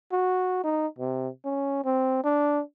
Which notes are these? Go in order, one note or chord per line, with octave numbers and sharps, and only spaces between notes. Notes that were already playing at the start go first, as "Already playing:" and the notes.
F#4
D#4
C3
C#4
C4
D4